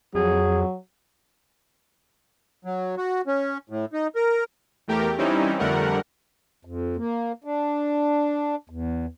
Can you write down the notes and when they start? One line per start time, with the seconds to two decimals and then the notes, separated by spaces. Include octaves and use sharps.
0.15 F2 F#3 G#4
2.65 F#3
2.98 F#4
3.27 C#4
3.70 A2
3.93 D#4
4.16 A#4
4.88 E2 A3 G4 A#4 G5
5.18 E3 G3 C4 C#4 D#4 E4
5.59 F2 D3 G3 A3 A#4 F#5
6.65 F2
6.97 A#3
7.44 D4
8.70 E2